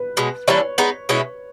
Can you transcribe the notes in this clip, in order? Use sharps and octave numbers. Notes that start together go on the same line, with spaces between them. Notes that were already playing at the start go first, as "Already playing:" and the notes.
Already playing: B4
B2 G#3 C#4
E3 G3 A#3 D4 C#5
G#3 B3 D#4
B2 G#3 C#4 E4